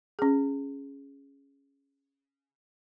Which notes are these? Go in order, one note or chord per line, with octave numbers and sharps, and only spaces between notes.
C#4 G#4